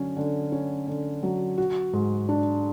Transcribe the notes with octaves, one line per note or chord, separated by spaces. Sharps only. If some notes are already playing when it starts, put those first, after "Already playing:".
Already playing: D3 F#3 C#4
D3
C#4
D3
F#3
F#4
G#2
D4